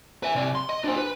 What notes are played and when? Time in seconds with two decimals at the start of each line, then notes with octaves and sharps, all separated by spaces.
0.23 B4 E5
0.35 C3 D5
0.55 C6
0.69 D#5
0.84 D4 C5
0.97 B4